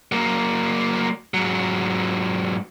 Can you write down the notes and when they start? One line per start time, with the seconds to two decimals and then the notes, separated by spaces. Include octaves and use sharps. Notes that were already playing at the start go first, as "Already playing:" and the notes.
0.12 F#3 A#3
1.34 G#2 F#3